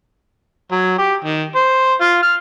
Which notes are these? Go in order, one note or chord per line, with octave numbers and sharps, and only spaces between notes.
F#3
G4
D#3
C5
F4
F6